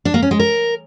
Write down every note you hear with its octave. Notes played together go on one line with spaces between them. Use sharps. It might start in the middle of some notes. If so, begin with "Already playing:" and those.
D4
A#3
C#4
G#3
A#4